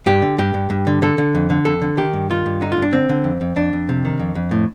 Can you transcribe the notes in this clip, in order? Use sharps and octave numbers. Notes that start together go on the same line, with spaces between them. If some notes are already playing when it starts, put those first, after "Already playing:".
G2 G4
D3
G2 G4
G2
G2
D3
D3 A4
D3
F2
D3
F2 A4
D3
D#3 G4
G2
D#3 F4
G2
D3 D#4
F4
G2
D4
D3 C4
D3
F2
F2
F2 D4
F2
C3
D#3
F2
F2
A2